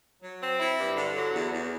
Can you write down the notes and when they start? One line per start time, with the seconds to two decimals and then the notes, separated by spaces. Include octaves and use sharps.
0.21 F#3
0.40 C4
0.59 E4
0.77 G2
0.95 D3
1.14 F#3
1.33 E2
1.52 E2